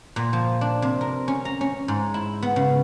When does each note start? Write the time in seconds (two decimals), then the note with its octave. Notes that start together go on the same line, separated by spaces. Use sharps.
0.16 A#2
0.33 F3
0.61 D4
0.82 C3
1.01 A#4
1.28 C#4
1.45 A#5
1.61 C#4
1.88 G#2
2.14 E4
2.43 B3
2.56 C#3